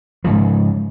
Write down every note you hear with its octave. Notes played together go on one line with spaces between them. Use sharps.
G#2 C#3 F3